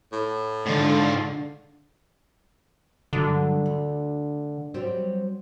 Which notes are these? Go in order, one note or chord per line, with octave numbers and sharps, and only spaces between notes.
A2
G#2 D3 G#3 F4
G2 D3 F#3 D#5
D2
F#3 G3 C4